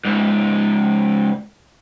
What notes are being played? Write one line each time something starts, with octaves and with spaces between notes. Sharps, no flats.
C#2 G#2